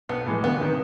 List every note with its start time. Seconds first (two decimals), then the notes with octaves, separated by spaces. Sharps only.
0.09 B1 B3
0.26 A2 E3 G#3
0.43 D2 B3
0.60 C3 D#3